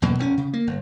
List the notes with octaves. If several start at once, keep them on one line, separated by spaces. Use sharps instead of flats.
E2 B2 F#3 A#3
F1 A2 C#4
C#3
A#3
G1